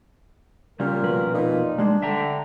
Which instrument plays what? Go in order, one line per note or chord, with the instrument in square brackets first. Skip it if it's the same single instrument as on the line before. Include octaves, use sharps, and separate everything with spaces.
[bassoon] A#2 [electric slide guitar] C#3 G3 [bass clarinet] A#4
[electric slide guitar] F2 B2 B4
[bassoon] A#2 [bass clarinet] D#4
[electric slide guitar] G3 G#3 [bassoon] D4
[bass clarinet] D3 [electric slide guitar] E5 G5 A#5